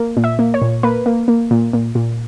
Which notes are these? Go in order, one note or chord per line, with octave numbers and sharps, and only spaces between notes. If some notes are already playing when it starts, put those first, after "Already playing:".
Already playing: A#3
A#2
E5
A#3
C#5
A#2
A#3 B4
A#3
A#3
A#2
A#2
A#2